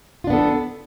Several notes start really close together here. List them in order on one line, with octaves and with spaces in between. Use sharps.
F4 D4 B3 A4